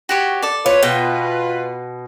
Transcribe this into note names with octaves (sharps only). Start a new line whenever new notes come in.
F#4 G4 C#5
A4 D5
F4 B4 C#5
B2 G5